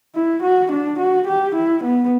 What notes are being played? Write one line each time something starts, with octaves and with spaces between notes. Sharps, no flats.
E4
F#4
D4
F#4
G4
E4
B3